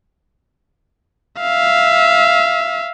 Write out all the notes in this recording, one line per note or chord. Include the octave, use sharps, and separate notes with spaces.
E5 F5